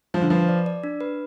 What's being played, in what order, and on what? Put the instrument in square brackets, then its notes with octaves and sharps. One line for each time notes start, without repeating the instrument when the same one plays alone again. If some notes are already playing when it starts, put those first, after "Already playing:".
[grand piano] F3 [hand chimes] F4
[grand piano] D3
[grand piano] F3 [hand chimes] B4
[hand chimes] D5
D5
D4
B4